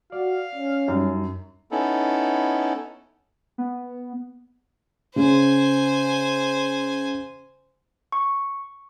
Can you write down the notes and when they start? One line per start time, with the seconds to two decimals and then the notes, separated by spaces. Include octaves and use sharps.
0.12 F#4 D5 F5
0.55 C#4
0.88 F#2 G3 D4 D#4
1.71 B3 C#4 D#4 E4 A4
3.58 B3
5.16 C#3 C5 G#5
8.12 C#6